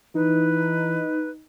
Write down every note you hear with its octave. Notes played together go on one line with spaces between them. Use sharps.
E3 D#4 B4